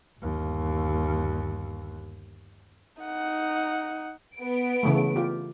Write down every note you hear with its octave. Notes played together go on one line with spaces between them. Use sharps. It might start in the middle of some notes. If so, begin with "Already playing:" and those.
G1 D#2
D#4 F#5
B3 D7
C#3 E3 A3
F4 G4